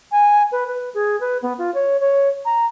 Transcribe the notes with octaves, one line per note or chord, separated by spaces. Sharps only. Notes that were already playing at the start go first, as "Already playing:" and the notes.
G#5
B4
B4
G#4
B4
B3
F4
C#5
C#5
A#5